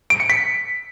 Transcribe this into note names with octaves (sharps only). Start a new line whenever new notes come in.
D7
C#7
B6